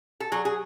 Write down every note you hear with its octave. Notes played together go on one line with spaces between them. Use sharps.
A4
F#3 G#4
G#4